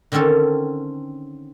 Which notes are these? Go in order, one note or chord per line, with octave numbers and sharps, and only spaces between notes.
D3 D#3 C4 C#4 A4